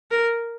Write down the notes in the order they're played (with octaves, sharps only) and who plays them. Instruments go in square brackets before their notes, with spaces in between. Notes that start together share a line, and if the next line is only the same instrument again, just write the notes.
[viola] A#4